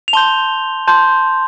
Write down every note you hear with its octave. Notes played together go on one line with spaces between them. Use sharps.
F7
A5 C6 G6 G7
A5 C6 G6